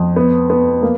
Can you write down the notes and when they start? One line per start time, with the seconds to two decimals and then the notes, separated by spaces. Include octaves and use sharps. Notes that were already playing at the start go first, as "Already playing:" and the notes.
Already playing: F2
0.16 B3
0.50 B3
0.82 A#3